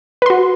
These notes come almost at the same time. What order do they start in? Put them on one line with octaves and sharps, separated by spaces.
B4 C6 F#4